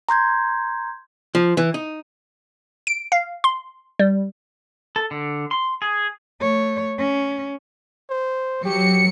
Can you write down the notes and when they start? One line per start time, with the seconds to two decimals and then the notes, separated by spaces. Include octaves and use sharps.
0.09 A#5 C6 G6 G#6
1.35 F3
1.57 E3
1.74 D#4
2.87 D7
3.12 F5
3.44 C6
3.99 G3
4.96 A4
5.11 D3
5.51 C6
5.82 G#4
6.40 A3 C#5
6.98 C#4
8.10 C5
8.65 F#3 G4 C#7